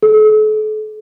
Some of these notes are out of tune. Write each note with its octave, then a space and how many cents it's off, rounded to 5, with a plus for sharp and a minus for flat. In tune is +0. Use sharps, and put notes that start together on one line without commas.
A4 -40